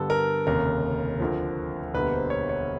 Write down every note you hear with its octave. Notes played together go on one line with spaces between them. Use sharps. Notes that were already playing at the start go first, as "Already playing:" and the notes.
Already playing: G2 D3 G3 B3 A4
A#4
F1 D#2 C#3 A#4
D2 D3 F3
E1 D2 D3 G3 A#3 B4
C5
C#5
C#5